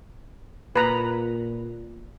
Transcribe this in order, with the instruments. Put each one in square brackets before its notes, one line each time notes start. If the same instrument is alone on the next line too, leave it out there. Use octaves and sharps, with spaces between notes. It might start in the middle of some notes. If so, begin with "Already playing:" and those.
[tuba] A#2 [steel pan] B4 A#5